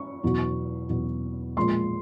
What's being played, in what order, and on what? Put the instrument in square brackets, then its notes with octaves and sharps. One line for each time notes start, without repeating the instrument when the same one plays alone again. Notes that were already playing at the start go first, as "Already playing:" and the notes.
Already playing: [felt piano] C#6
E2 B2 F#3
E2 B2 F#3
A#2 F3 G#3 C6